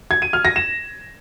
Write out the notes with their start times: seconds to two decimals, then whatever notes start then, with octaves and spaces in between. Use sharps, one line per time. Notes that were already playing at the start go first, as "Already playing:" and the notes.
0.11 G#6
0.22 D#7
0.33 F6
0.45 A#6
0.56 E7